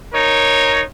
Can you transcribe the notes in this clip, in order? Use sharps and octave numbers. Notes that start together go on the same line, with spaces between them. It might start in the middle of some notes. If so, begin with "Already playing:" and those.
D#4 A#4 C#5